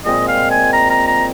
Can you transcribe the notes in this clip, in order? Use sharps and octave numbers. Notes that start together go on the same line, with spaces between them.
A#2 G#3 C4 D#5
F5
G#5
A#5
A#5
A#5